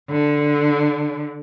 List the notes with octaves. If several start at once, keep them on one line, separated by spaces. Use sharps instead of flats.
D3